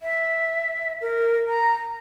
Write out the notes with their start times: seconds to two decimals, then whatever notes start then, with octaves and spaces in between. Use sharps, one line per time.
0.01 E5
1.01 A#4
1.48 A#5